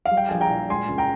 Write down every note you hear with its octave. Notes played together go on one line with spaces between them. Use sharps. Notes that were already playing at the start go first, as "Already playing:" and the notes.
F5
G3
G5
A#1 G#5
G5 A#5
A#2
G#3 G#5 C6
C#2
G5 A#5